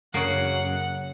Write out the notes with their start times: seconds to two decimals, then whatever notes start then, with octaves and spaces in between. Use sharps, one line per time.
0.14 F#2 C#3 A#3 F#5